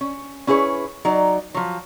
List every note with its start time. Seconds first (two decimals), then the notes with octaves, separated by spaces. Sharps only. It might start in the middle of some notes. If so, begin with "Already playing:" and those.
0.01 C#4
0.47 C#4 E4 G#4 B4 C#5
1.05 F#3 D#4 D5
1.54 F3 F#3